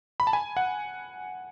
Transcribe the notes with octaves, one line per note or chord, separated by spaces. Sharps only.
B5
A5
G#5
F#5